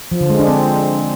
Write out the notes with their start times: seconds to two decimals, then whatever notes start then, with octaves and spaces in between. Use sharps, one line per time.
0.12 F3
0.21 D3
0.30 G#3
0.39 D4
0.48 C4